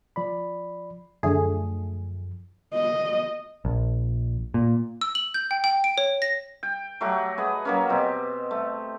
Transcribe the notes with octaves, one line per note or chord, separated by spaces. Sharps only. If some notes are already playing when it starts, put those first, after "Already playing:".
F3 D5 B5
F#2 D3 F3 A3 G#4
D#5
A#1
A#2
E6
F#7
G6
G5
G5
D7
C#5
A#6
G5
F#3 A3 F#4 G4
G#4 B4 D#5
F#3 A#3 C#4
B2 C4 G4
A3